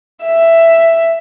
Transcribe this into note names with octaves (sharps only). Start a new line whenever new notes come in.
E5